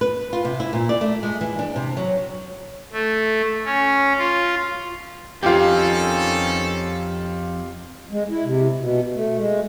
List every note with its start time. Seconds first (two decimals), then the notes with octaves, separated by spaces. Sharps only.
0.01 B4
0.33 F4
0.45 C3
0.60 E4
0.73 A#2
0.89 D5
1.01 A3
1.23 G#3
1.41 E3
1.59 D4
1.76 C3
1.97 F#3
2.92 A3
3.65 C#4
4.18 F4
5.43 F2 D#3 C#4 F4 G4 A4
8.11 G#3
8.30 E4
8.45 C3
8.79 B2
9.13 A3
9.38 G#3